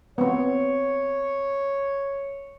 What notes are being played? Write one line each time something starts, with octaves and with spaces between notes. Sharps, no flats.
B3 C4 C#5